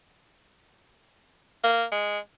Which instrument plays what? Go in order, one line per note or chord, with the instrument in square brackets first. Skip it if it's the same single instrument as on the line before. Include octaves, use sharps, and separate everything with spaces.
[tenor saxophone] A#3
G#3